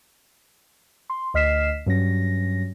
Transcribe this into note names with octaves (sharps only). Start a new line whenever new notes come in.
C6
D2 D#5 F6 B6 C7 E7
G2 F#3 C#4 A#6